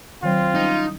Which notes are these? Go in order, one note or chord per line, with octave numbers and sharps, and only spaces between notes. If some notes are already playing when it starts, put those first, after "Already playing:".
D#3 F#3 C4 F4
G3 C#4 D#4